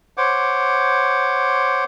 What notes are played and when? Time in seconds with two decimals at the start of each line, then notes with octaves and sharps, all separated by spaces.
0.17 C5 C#5 F#5 D6